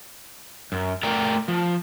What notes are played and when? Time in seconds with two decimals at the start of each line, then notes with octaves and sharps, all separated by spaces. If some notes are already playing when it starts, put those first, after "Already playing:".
0.72 F#2
1.03 A3 A#4 D5 G5 A#5
1.48 F3